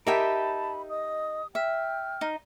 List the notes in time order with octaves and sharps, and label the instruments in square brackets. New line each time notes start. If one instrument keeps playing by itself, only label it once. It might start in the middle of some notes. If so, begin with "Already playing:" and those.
[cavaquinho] D#4 E5 G5 [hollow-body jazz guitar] G4 A#4 [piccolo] A5 [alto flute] B5
[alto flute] D#5 [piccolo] D#6
[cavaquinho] E5 [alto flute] G5 [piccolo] F6
[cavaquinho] D#4